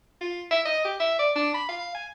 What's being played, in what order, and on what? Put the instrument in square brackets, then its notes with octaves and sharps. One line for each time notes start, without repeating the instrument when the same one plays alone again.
[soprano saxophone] F4
E5
D#5
G4
E5
D5
D4
B5
F5
G#5